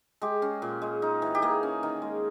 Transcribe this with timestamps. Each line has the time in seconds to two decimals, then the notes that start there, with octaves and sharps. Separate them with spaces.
0.22 G#3 G4
0.42 C#4
0.62 A#2
0.82 G#3
1.02 D#4
1.22 E3
1.35 G4
1.42 A#3 G#4
1.63 C#4
1.83 D#3
2.02 G#3